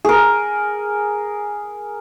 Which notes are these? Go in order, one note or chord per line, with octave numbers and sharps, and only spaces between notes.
G#4 A#4